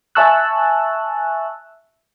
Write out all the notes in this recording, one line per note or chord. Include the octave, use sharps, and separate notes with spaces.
E5 G#5 A5 C#6 E6 F#6